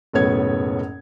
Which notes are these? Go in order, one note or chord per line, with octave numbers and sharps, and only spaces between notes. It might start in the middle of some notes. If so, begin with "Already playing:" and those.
F#1 B1 A2 B3 C#5 G#6